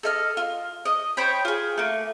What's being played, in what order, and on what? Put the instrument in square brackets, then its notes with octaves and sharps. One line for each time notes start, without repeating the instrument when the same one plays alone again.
[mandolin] A4 D#5 F6
F4
D#5
C5 C#5 G5 B5
F4 G#4
A3 A#3